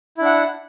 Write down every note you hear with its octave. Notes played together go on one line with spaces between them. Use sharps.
D4 E4 F#5